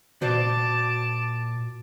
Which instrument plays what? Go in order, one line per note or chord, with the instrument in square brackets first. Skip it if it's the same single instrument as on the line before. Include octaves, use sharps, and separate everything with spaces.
[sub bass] A#2 [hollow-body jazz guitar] F#4 C5 D5 [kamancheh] A5 D6